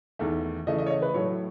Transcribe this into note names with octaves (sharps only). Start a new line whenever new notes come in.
E2 D#3 A3
C#3 E3 A3 D#5
D#5
C#5
D#5
B4
A2 F#3 A3 C#5